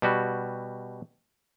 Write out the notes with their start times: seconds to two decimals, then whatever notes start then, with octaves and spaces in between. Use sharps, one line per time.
0.02 B2 G3 F#4